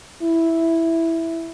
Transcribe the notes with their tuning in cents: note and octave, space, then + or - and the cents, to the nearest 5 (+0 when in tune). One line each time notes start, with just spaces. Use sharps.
E4 +0